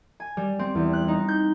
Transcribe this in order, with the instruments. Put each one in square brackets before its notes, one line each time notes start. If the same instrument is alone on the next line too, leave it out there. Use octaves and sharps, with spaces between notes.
[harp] G#5
G3
C4
E2
F#6
D#4
G6